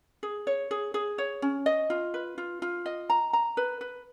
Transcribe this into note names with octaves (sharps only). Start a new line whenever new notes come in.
G#4
C#5
G#4
G#4
C#5
C#4
D#5
F4
B4
F4
F4
D#5
A#5
A#5
B4
B4